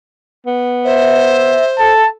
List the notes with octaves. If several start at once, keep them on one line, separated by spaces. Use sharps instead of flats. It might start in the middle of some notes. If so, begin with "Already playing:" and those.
B3
C5 E5
A4 A5